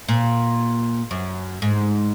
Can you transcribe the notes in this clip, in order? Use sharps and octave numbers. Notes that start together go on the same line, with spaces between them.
A#2
F#2
G#2